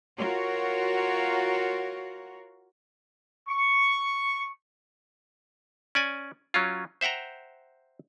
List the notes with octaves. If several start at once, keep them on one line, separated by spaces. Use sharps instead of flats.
F4 F#4 A#4 C#5
C#6
C#4 D5 G#5
F#3 C#4 F4
C5 E5 F#5 G5 A#5